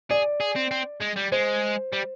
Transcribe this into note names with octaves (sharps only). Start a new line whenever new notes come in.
G#4 D5
G#4
C4
C4
G#3
G3
G#3 C5
G3